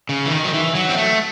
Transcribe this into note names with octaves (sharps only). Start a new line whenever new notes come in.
C#3
E3
D#3
F#3
E3
F#3
C4
A3